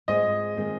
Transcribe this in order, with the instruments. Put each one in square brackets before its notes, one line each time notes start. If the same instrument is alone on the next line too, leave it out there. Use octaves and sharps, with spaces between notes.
[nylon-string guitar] G#2 G#3 C4 F4 C5 [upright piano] D#5
[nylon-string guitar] D#3 G#3 C4 F4